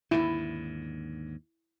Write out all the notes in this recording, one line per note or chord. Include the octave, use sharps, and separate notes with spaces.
D#2 G#2 D3 E4